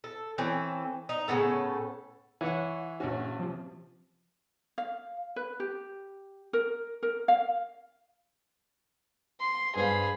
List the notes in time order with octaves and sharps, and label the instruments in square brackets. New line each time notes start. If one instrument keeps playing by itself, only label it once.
[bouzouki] A4
E3 C4 C#4 A4
D#4
A2 C#3 B3 A4
[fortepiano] E3 [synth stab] C#5 F#5 C#6
[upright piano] A#1 C#4 [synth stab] F#4
[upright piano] C3 [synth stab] F3
[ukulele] F5
B4
G4
A#4
A#4
F5
[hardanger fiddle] C6
[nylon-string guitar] G2 C5 F5 [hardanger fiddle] G#4 B5